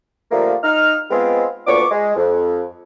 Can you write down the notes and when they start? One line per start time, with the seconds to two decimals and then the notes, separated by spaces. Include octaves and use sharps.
0.31 D3 F3 G3 A3 A#3
0.63 D#4 F6
1.11 G#3 B3 C4 F4
1.67 D2 A#2 B3 D4 C#6 D6
1.91 G#3
2.16 F2